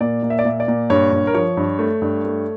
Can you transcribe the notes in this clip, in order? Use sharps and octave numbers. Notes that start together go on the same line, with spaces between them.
A#2 D5
A#2
E5
D5
A#2 E5
D5
A#2
G2 C#5
G2
A#4
F3 C#5
G2
A3
G2
A3